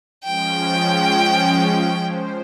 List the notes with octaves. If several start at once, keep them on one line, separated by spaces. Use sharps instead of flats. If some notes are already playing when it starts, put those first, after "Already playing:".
F3 G#3 C#4 G5
C5